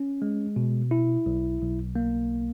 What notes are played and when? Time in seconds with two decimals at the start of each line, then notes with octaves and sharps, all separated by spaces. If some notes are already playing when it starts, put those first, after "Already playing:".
Already playing: C#4
0.22 G#3
0.56 B2
0.91 E4
1.26 B1
1.62 B1
1.96 A#3